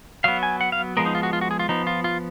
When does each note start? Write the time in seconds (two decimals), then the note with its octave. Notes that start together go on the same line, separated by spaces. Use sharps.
0.24 F#3 B3 F5
0.43 G#5
0.61 F#5
0.72 F5
0.97 F3 G#3 B3 A#4
1.06 D#4
1.15 F4
1.23 F#4
1.33 F4
1.41 F#4
1.51 G#4
1.59 F4
1.69 F3 B3 D#4
1.87 F4
2.04 F4